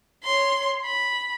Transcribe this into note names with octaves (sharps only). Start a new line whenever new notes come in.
C#5 C6
B5